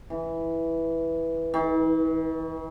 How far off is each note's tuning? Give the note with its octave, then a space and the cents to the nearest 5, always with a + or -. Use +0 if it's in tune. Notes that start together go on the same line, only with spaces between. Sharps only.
E3 -5
E3 -45